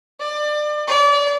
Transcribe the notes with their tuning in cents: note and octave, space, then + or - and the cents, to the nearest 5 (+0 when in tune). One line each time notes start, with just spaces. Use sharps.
D5 +30
D5 -35